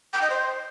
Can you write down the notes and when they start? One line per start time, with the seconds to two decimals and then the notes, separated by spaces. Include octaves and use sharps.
0.13 G5
0.22 D#5
0.30 C5